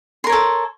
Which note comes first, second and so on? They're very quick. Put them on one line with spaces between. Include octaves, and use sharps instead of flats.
C6 A#4 C#5 A4